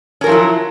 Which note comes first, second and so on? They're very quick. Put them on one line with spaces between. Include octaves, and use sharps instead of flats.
C#4 A#4 F3 E4 F#3